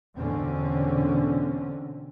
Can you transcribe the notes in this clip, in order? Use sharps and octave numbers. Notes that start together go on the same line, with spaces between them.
E2 B2 D3 C4 C#4